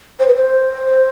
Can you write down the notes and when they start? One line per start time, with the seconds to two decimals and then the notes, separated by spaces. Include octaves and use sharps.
0.19 C5
0.27 B4
0.35 C5